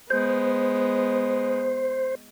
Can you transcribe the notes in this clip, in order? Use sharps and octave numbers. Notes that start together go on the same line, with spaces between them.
G#3 B3 C5